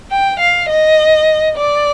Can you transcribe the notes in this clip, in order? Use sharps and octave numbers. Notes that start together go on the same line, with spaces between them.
G5
F5
D#5
D5